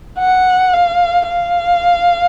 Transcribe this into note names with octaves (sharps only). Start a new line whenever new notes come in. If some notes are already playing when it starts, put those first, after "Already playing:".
F#5
F5
F5